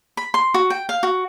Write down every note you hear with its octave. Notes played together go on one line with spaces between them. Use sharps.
B5
C6
F#4
G5
F5
F#4